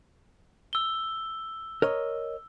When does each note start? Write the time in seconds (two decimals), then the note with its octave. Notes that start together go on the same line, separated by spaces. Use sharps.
0.73 E6 G7
1.82 A#4 C#5 D#5